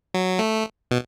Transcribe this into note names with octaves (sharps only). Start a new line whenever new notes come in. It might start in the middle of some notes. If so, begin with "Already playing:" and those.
F#3
A3
B2